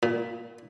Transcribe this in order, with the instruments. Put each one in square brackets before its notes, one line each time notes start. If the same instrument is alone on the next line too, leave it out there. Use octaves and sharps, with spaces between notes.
[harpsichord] A#2